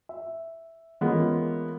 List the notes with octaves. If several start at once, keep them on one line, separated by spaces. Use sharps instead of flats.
E5
E3 G#3 A#3 B3 C#4 F4